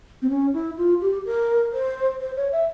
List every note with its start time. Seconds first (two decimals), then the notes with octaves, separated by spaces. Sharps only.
0.22 C4
0.30 C#4
0.54 E4
0.77 F4
1.01 G4
1.26 A#4
1.73 C5
2.20 C5
2.37 C#5
2.52 E5